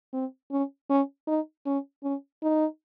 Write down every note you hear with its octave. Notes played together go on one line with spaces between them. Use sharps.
C4
C#4
C#4
D#4
C#4
C#4
D#4